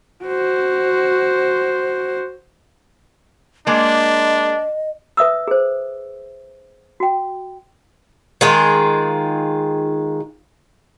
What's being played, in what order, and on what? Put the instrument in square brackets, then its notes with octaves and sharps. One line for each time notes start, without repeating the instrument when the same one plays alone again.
[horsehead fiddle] F#4 C5
[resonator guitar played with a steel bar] G#3 A#3 [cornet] D4 [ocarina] D#5
[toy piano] B4 E5 D#6 E6
G#4 C5
F#4 G5
[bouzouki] D#3 G#3 F4 G#4